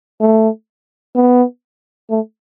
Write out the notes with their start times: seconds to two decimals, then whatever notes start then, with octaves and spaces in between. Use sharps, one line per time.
0.21 A3
1.16 B3
2.10 A3